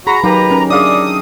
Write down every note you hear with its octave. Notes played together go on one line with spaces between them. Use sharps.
F#4 G#4 A#5 B5
F#3 A#3 D#4 G4 B4
C#4 A#4
D4 G#4 D5 E5 F5 C#6 D#6